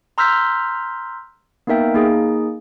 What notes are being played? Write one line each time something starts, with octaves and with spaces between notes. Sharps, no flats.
A#5 C6 E6 F6 G6 B6
A#3 B3 D#4 A#4 E5 G5
A#3 D#4 G#4